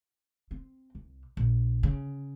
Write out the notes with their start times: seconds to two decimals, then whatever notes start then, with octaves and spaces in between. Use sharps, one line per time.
0.51 C4
0.95 C2
1.37 A#1
1.83 C#3